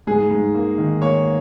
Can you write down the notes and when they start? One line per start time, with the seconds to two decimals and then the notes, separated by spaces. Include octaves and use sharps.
0.07 G#2 G#4
0.31 G#2
0.54 A#3
0.78 D#3
1.02 A#3 C#5